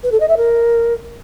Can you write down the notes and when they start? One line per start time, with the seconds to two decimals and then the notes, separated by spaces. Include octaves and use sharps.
0.04 B4
0.12 A4
0.20 D#5
0.29 E5
0.37 A#4